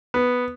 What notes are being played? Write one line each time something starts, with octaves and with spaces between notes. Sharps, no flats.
B3